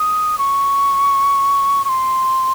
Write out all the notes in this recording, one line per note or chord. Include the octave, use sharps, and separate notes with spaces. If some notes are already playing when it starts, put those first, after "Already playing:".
Already playing: D#6
C#6
C#6
C6